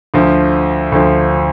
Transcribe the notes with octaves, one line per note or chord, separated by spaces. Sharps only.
D2 D3 F3
D2 D3 F3